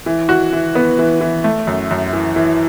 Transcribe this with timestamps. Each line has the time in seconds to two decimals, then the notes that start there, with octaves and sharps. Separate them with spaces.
0.06 E3
0.29 F#4
0.53 E3
0.75 B3
0.99 E3
1.21 E3
1.44 A3
1.67 F#2
1.91 F#2
2.13 E3
2.36 E3